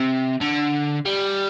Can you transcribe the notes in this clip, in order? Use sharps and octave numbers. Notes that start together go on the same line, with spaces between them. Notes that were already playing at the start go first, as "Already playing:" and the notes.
Already playing: C3
D3
G3